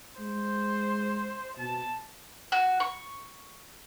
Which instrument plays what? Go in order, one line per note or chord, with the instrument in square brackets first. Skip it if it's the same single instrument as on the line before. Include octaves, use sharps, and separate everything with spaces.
[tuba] G#3 [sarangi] C5
[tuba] B2 [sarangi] A5
[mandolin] F#4
C#6